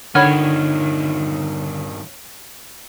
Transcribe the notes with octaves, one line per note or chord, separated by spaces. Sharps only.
G2 D3 D#3 C#5 F#5 B5 F6